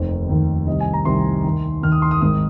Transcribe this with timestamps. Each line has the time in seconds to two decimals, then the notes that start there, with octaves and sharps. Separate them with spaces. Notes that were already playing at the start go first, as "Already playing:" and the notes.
Already playing: F1 D#2 D#3 C5
0.29 F1 D#2 D#3
0.67 C2 C3 D#3 D#5
0.80 G#5
0.93 A#5
1.05 C2 C3 D#3 C6
1.44 D#2 D#3
1.83 D#2 D#3 F6
1.92 D#6
2.02 C6
2.11 D#6
2.21 G#1 G#2 D#3 D#6